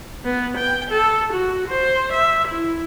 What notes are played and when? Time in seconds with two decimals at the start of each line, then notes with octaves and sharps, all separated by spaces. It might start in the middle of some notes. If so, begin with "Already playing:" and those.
0.25 B3
0.57 G5
0.91 A4
1.32 F#4
1.68 C5
2.12 E5
2.48 E4